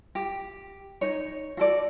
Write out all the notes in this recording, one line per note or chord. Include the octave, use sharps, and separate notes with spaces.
G4
D#4 C#5
F#4 A4 D5